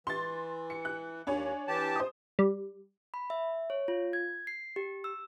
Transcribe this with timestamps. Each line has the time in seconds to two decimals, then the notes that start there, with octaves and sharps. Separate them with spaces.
0.07 E3 C6 A6
0.70 C#7
0.85 F#6
1.27 D#2 D4 C#5 G#5
1.68 E3 G4 A5
1.96 C5 D#6
2.39 G3
3.14 B5
3.30 E5
3.70 C#5
3.88 F4
4.13 G#6
4.47 C7
4.76 G4
5.04 E6